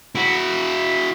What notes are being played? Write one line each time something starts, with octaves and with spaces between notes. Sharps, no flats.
E4 F#4